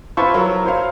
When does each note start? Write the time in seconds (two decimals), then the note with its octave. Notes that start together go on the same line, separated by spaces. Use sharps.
0.17 E4 F4 B4 C5 A5 C#6
0.34 F#3 A#4
0.65 E4 C5 C#5 F5